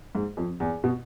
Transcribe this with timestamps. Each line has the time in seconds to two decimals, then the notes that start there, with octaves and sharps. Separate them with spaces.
0.15 G#2
0.37 F2
0.60 E2
0.84 B2